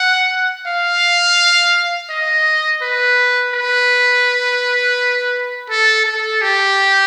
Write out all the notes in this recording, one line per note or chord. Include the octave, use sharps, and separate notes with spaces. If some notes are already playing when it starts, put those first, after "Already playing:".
Already playing: F#5
F5
D#5
B4
B4
A4
A4
G4